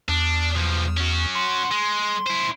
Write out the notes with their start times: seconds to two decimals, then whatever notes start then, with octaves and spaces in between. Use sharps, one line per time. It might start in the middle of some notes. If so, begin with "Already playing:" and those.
0.09 E2 D4
0.55 B1 F3
0.97 C#4 F#4
1.35 C6
1.71 G#3
2.27 E4 C5